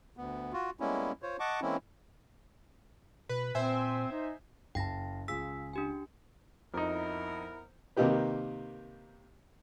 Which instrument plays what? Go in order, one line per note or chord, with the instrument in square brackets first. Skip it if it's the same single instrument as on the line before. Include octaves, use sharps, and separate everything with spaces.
[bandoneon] D2 B3
F4 F#4
G3 G#3 A#3 B3 C#4 E4
F4 C5 C#5
D#5 F#5 A5 C#6 D6
E3 G#3 A#3 C4 C#4 E4
[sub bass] B2 [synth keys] B4
[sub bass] A#2 [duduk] C4 [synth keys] C5 E5 G#5
[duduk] D#4
[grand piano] F#1 A5 [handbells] G5 A#6
[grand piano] C#2 F4 G#4 [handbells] E6 B6
[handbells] D4 G4 G#5
[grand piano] F2 D#4 [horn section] B3 E4 A#4
[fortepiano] C3 D#3 A#3 D#4 G4 B4